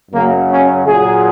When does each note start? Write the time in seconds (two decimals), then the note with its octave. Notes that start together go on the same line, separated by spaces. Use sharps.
0.11 F#2 C#3 F#3 A#3
0.49 C#4
0.86 A#2 F#3 G#4